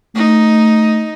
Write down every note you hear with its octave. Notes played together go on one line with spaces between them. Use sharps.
A3 D#4